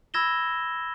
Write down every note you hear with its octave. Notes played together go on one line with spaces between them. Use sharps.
B5 E6 G#6 A#6 E7 G7